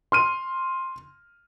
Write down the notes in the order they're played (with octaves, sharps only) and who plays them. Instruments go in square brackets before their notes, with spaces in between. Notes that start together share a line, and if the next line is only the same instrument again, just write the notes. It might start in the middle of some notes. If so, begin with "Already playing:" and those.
[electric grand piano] C6 F6 D#7